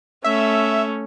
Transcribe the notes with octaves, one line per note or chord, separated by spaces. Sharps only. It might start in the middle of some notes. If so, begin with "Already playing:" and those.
A3 C#4 E5